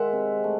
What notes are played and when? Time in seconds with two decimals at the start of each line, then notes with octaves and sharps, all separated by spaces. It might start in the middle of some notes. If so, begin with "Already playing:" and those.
Already playing: D#3 G#3 E5 F#5
0.13 C3
0.44 A3